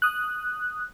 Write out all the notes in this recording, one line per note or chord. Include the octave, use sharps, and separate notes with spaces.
D#6 F#6